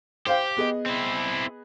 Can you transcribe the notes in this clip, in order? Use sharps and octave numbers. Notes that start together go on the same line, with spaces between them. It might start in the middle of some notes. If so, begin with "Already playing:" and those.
G4 C5 F5 G5
B3 G#4 D#5
C4 E4